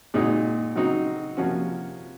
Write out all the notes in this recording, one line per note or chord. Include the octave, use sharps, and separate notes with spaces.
A#2 G#3 C4 D#4 F#4
C#3 F#3 C4 D#4 F#4
C3 F3 A#3 C#4 F#4